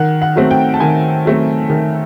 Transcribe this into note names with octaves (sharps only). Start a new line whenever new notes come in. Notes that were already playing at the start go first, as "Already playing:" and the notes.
Already playing: D#3 F#5
F#5
F#3 A3 C4
G5
A5
D#3 G#5
F#3 A3 C4
D#3